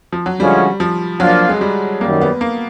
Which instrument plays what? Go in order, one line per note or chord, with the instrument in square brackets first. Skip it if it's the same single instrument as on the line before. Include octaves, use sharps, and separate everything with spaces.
[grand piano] F3
F#3
[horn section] D3 F3 G#3 C#4 F#4 [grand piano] G3
[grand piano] F3
[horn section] F3 A#3 D4 F4 [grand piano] F#3
[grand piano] G#3
G3
[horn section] F#2 D#3 G3 [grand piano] A#3
[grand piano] B3
A#3